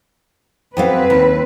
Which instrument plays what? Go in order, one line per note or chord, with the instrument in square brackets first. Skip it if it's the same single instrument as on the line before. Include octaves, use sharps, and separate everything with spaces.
[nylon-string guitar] F2 F#3 F5 [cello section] C4 B4
[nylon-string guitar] D#2